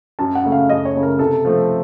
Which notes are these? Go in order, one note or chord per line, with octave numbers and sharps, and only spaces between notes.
F#2 A5
F#5
C#3 A3
F5
F#2 D#5
C#5
C#3 A3
A#4
C3 A4
F3 A3 C4